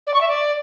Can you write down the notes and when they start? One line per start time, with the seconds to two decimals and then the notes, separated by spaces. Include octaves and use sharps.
0.06 D5
0.14 C#6
0.21 E5
0.28 D5